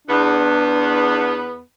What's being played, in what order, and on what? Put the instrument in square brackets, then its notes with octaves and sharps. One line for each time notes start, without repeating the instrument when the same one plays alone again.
[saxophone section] E2 B3 [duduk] D4